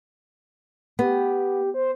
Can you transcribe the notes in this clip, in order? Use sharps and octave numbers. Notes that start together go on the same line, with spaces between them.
B3 G4
C5